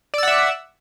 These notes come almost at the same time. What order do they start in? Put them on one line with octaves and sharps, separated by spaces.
D5 E6 F#5 E5